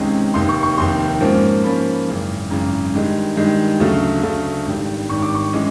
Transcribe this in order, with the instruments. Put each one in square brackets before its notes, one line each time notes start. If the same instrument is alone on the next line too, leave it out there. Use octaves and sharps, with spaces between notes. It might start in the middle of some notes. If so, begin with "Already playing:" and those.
Already playing: [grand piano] C#2 C3 D#3 G#3 C#4
F1 D#2 D#3 C6
C#6
C#6
F1 D#2 D#3 C6
G#2 F3 A#3 C#4
G#2 F3 A#3 C#4 B5
G#1 F#2 C#3 E3
G#1 F#2 C#3 E3 A#5
G2 D#3 G#3
G2 D#3 G#3
D2 C#3 F#3 A3
D2 C#3 F#3 A3
G#1 G2 D#3
G#1 G2 D#3 C#6
D6
C#6
E3 G#3 C#4